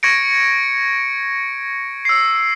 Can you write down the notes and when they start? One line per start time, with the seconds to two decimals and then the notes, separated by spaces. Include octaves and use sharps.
0.03 C#6 G#6 A#6 C#7 D7
2.05 E6 C7